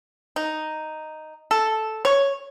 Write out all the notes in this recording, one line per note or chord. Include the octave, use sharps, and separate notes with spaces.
D#4
A4
C#5